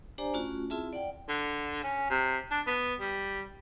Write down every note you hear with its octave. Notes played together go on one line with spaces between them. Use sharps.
D4 G4 C5 D5 G#5 A#5
A3 C#4 F4 F#4
C4 E4 F4 G#4 E5 A5
D5 F#5 G5
D3
C#4
C3
D4
B3
G3